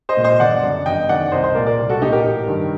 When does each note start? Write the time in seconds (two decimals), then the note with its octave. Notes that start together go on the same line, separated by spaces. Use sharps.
0.09 C5 D#5
0.17 A#2
0.24 C5 D#5
0.40 G1 D5 F#5
0.62 F#2 D3
0.86 G1 D#5 G5
1.09 F#2 D#3 D5 F#5
1.32 C2 C5 D#5
1.44 C5 D#5
1.55 A#2 A#4 D5
1.66 A#4 D5
1.78 C2
1.89 F#4 A4
2.01 A#2 D#4 G4
2.12 G4 A#4
2.24 A1
2.47 G2 D#3